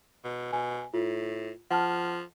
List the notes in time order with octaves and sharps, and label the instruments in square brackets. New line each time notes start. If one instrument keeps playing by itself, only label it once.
[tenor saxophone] B2
[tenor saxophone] B2 [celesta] G#5
[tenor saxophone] A2 [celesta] F4
[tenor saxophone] F3 [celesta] F#5 A5 F6